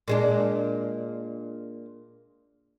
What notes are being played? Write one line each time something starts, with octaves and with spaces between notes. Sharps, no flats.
A#2 G#3 D4